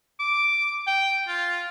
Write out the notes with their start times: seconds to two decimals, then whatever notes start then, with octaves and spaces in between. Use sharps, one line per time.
0.20 D6
0.87 G5
1.28 F4